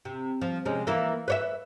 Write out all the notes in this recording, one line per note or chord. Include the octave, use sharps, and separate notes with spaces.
C3
F3
C3 G#3 C#4
E3 A#3 E4
B4 C#5 E5